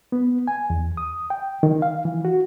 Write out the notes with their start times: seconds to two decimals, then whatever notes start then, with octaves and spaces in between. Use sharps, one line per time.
0.12 B3
0.48 G#5
0.70 E2
0.97 D#6
1.30 G5
1.63 D#3
1.82 F5
2.05 E3
2.25 F#4